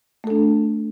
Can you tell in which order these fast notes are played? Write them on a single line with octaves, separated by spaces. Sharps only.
A3 A4 D4